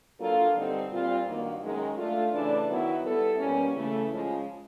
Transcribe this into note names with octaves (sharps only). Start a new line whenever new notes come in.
F#3 A#3 D4 F4 A4
G2 D3 G3 C4 D#4
A#2 G3 C4 F4
G2 D#3 F#3 A#3
F#2 D#3 G#3
A3 D4 F4
C#3 E3 A3 D4
D#3 F#3 B3 E4
G3 B3 E4 A4
B2 G3 A#3 C#4
C#3 E3 A3
C#3 F3 G#3